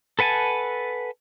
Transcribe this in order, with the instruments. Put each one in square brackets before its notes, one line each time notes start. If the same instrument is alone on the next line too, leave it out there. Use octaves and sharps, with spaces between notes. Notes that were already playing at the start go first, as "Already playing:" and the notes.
[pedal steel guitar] A4 B4 F#5 G#5 A5